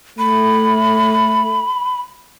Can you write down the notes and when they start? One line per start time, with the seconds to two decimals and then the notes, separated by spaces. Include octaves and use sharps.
0.19 A3 B5